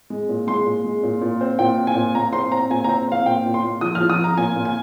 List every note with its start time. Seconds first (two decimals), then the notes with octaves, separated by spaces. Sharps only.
0.10 G#3
0.29 A#2
0.47 G#3 C6
0.66 A#2
0.84 G#3
1.03 A#2
1.21 A#2
1.41 C4
1.59 A#2 G5
1.77 C4
1.87 G#5
1.95 A#2
2.15 A#2 A#5
2.33 C4 C6
2.52 C4 A#5
2.70 A#2 G#5
2.84 C4 A#5
3.08 C4 F5
3.26 A#2 G5
3.45 A#2
3.54 C6
3.63 A#2
3.81 F3 D#6
3.95 F6
4.00 F3
4.10 D#6
4.18 F3
4.24 A#5
4.37 A#2 G#5
4.55 A#2
4.65 G#5